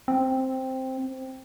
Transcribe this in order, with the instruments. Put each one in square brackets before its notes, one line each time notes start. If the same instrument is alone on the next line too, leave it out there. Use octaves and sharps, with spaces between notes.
[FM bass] C4